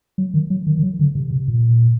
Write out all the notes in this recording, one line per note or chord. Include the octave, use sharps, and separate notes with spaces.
F#3
D#3
F#3
D#3
D#3
F#3
D3
C3
C3
A#2